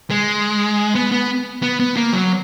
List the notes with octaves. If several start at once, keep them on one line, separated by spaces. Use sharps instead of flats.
G#3
B3
B3
B3
B3
A#3
F#3